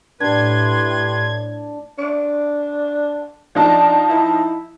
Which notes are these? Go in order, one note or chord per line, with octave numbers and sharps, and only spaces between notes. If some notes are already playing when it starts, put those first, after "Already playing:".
A2 D4 G4 B4 C6 G#6
D4
F3 D4 D#4 A5
E4